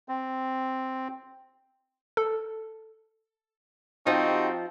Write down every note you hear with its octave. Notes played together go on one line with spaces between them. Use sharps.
C4
A4
F3 C4 D#4 F#4 G4